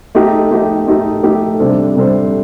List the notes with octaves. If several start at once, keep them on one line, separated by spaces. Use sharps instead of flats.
A3 D#4 G4
A3 D#4 G4
A3 D#4 G4
A3 D#4 G4
C3 G3 D4 A4 C5
C3 G3 D4 A4 C5